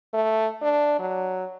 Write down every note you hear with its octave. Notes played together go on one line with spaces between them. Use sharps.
A3
D4
F#3